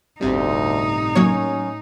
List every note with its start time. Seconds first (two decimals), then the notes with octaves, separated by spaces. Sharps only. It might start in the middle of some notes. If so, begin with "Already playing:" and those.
0.21 G1 D2 A2 C3 G3 D#4
1.15 F#3 A#3 C#4 C#5